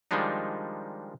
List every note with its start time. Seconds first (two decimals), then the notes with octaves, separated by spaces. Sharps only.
0.11 D#3 F3 G3 G#3 D4 D#4